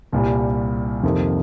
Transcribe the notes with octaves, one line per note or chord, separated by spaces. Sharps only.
C2 A#2 G3
F2 C3 D#3 A#3